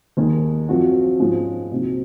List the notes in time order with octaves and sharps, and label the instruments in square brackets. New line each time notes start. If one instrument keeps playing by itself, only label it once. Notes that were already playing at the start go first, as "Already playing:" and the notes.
[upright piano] D#2 D#3 G#3 D#4
F#2 F3 C4 F#4
G#2 F3 G#3 C#4
C2 A#2 F#3 C4 D#4